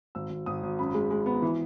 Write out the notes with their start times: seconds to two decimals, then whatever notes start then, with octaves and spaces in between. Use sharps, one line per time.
0.15 G#1 E6
0.30 G#1
0.46 G#1 D#6
0.63 G#1
0.79 F#2 B5
0.94 G#3
1.11 G#3
1.26 B3
1.42 E3